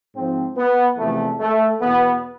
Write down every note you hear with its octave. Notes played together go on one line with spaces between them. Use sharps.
G#2 F3 C4
B3
E2 C3 F3 A3
A3
E2 B2 B3